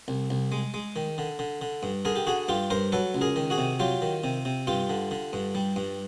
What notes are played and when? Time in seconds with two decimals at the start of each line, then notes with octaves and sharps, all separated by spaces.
0.08 C2
0.30 C2
0.52 G#3
0.74 G#3
0.96 D#3
1.18 D3
1.39 D3
1.61 D3
1.83 G2
2.05 D3 G#4 A#4
2.16 G4
2.27 D3 F#4 G#4
2.48 G2 F4 G4
2.70 G2 A#4 C5
2.92 F#3 A4 B4
3.14 C#2
3.21 G#4 A#4
3.36 D#3
3.50 F#4 G#4
3.58 C3
3.80 F#3 F4 G4
4.02 D#3
4.24 C3
4.45 C3
4.67 G2 F4 G4
4.89 D3
5.11 D3
5.33 G2
5.55 G3
5.76 G2